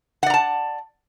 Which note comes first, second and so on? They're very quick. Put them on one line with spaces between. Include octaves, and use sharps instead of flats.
F#5 D5 A#5 A5